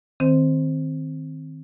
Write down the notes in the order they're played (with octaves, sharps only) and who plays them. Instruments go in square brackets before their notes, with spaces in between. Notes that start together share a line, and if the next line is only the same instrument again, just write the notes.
[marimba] D#3 C4 C5